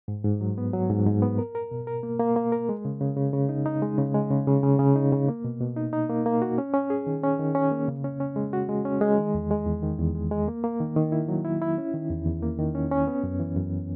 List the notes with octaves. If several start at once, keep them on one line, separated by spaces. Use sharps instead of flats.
G#2
G#2
F#3
B3
F#3
G#2
G#2
B3
A#4
A#4
B2
A#4
A#3
A#3
A#3
A#4
G#3
C#3
C#3
C#3
C#3
D#4
D#4
G#3
C#3
G#3
C#3
C#3
C#3
C#3
D#4
C#3
A#3
B2
B2
D#4
D#4
A#3
A#3
F#4
C#4
C#4
G#4
D#3
C#4
D#3
C#4
A#3
C#3
C#4
C#4
G#3
F#4
G#3
C#4
G#3
D#3
E2
G#3
E2
D#3
E2
G#3
G#3
A#3
A#3
D#3
D#3
E4
F#3
E4
E4
C#4
D#3
E2
E2
A#3
D#3
C#4
C#4
B3
F#2
E3
F#2